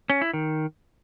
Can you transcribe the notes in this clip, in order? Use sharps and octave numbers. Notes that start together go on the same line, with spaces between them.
C#4
E4
D#3